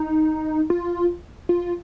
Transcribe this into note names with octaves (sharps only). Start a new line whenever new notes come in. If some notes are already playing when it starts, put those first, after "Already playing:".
Already playing: D#4
F4
F4